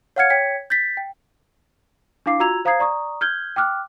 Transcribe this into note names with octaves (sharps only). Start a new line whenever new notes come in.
C#5 F5 F#5 F6 G#6 C#7
C#5 G5 G#6 B6 C#7
G6 A6 B6
G5
D4 E4 F5 D6 C7
F4 F#4 A#5 E6 G#6 F7
C5 F5 A#5 D#6 G#6 C7
D5 A#5 C#6 D#6
F6 G6 G#6 G7
G5 D6 F6 F#6